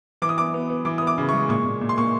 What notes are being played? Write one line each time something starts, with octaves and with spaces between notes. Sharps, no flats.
E3 D6
D#6
B3 D6
B3
B3
E3 D6
D#6
B3
D6
C#3
G#3 C#6
A#2 C#6
A#2
A#2
C6
A#3 C#6